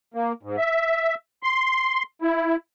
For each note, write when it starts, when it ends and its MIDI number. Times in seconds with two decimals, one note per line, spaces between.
0.14 0.32 58
0.43 0.56 44
0.58 1.15 76
1.43 2.03 84
2.22 2.56 64